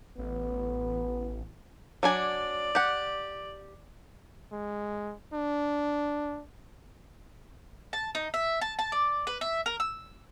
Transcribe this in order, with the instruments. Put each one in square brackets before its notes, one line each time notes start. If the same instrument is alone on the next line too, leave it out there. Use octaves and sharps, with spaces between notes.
[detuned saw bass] A1 [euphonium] B3
[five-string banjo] F#3 D4 G#5 [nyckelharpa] D5
[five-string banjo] G4 F#5
[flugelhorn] G#3
D4
[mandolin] A5
D#4
E5
A5
A5
D5
B4
E5
A#4
E6